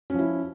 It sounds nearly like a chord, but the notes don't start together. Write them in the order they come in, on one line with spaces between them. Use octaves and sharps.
C#4 F3 E4